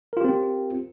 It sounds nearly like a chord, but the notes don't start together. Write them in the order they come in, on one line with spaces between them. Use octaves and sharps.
A#4 F4 G4 C4